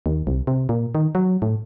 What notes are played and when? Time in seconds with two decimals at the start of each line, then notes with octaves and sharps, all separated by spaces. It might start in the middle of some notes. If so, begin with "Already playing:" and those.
0.06 D#2
0.27 C2
0.47 C3
0.69 A#2
0.95 D#3
1.15 F#3
1.42 A2